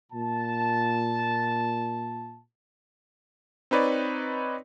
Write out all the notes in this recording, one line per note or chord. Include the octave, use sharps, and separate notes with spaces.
A#2 A5
C4 D#4 B4 C#5 D5